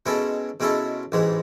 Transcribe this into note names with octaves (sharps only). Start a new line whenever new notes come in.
B2 G#3 C#4 E4 A4
B2 G#3 C#4 E4 A4
A1 G#2 E3 G#3